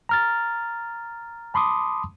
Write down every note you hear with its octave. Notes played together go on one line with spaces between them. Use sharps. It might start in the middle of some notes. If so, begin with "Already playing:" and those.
A#5 F6 A6
A5 B5 C6 D6 D#6